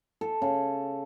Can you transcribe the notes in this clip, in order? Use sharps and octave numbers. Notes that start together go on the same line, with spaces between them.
A4
C#3